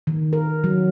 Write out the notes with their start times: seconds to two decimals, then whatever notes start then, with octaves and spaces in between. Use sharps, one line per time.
0.07 D#3
0.33 A#4
0.64 F#3